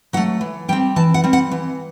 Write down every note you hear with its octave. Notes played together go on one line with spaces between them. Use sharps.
F#3 A3 F#5
E3
G3 C4 G5
E3 A5
F#5
G3 C4
F#5
E3